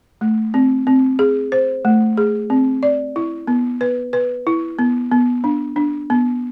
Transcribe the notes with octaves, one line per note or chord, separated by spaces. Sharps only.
A3
C4
C4
G#4
C5
A3
G#4
C4
D5
E4
B3
B4
B4
E4
B3
B3
D4
D4
B3